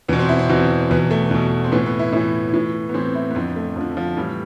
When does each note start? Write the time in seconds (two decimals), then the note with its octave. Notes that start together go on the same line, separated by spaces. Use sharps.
0.08 E2 B2 B3
0.19 C4
0.29 E4
0.39 C4
0.49 E2 B2
0.91 E2 B2 B3
1.11 A3
1.31 E2 B2
1.64 C4
1.72 A2 E3 B3
1.86 B3
1.99 E4
2.12 A2 E3 E4
2.54 A2 E3
2.89 B3
2.94 A2 E3 C4
3.15 E4
3.31 B3
3.35 F2 D3 C4
3.56 A3
3.76 F2 F3
3.81 D3
3.97 F3
4.17 A2 E3 G3